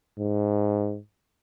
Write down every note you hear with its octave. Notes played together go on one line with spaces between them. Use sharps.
G#2